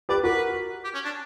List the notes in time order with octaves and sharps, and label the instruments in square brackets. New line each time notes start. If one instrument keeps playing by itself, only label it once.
[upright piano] G4 B4 [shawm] D5
[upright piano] F#4 A#4 [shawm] B4
[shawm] G4
C#4
D4